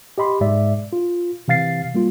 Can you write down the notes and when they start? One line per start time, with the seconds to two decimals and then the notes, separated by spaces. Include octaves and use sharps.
0.18 G4 D#5 B5 C6
0.41 G#2 G#3 D5 E5
0.93 F4
1.48 C3 E3 F5 A6 C7
1.95 G3 A#3 F4